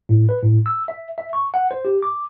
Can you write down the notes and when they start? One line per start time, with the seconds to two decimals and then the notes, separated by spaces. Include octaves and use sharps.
0.09 A2
0.29 B4
0.43 A2
0.66 E6
0.88 E5
1.18 E5
1.33 C#6
1.54 F#5
1.71 C5
1.85 G4
2.03 D6